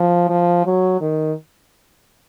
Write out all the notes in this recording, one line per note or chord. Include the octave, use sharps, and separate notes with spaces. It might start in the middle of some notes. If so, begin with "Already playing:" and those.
Already playing: F3
F3
F#3
D#3